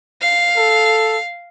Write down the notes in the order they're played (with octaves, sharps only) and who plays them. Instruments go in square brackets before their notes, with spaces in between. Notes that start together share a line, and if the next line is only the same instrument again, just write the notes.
[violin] F5
[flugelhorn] A4